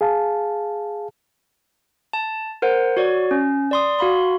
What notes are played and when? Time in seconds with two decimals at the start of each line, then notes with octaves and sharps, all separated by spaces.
0.01 G#4 F5 A5
2.13 A5
2.62 A#4 C5 F#5
2.97 F#4 C#5 D5
3.31 C#4
3.71 D5 C6 D#6
3.99 F#4 F5 B5 C6